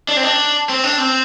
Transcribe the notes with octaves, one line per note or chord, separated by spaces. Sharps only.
D4
C4
D4
C4
D4
C4